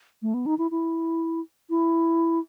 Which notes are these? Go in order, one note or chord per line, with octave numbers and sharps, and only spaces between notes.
A3
B3
D#4
E4
E4
E4